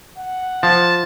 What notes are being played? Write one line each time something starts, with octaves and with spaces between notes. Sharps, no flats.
F#5
F3 A5